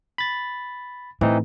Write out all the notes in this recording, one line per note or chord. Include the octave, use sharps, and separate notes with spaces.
B5 A6
A2 E3 C4 D#4